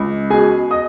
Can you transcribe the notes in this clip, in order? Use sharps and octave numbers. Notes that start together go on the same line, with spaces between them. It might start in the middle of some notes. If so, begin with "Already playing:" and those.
Already playing: C#2
B2 G#4 G#5
D#5 D#6